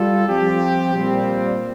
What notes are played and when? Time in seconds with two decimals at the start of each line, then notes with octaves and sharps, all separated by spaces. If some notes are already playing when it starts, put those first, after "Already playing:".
Already playing: G3 F4 A4
0.29 F3 C4 G4
0.94 A#2 G3 C4 F4